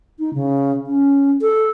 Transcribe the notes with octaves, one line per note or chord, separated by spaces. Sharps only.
D#4
C#3
C#4
A4